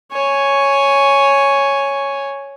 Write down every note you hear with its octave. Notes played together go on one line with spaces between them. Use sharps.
C#5 G#5